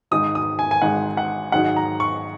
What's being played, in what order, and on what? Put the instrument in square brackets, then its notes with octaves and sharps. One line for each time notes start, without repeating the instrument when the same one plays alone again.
[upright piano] G#1 G#2 G#3 D#4 D#6
D#6
G#5
G#5
G#1 G#2 G#3 D#4 F#5
F#5
G#1 G#2 F#3 D#4 F#5
A#5
C#6